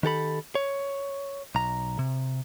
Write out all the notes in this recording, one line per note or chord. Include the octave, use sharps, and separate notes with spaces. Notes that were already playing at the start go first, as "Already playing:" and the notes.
D#3 G4 A4 B5
C#5
B1 A#5
C3